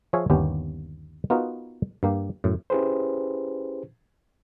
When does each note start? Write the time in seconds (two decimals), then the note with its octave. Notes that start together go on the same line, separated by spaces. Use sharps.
0.13 F3 G#4 C#5 E5 F5 G#5
0.30 G1 D#2 B3 C#4 G4
1.30 B3 D#4 F4 F#4 A#4 B4
2.03 G2 A#3 G4
2.44 F#2 A2
2.70 C#4 E4 G4 G#4 B4 C5